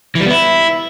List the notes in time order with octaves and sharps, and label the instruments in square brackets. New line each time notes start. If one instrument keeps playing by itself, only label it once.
[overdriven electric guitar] E3
G3
B3
E4